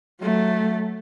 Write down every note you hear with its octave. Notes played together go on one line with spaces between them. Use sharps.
F#3 A3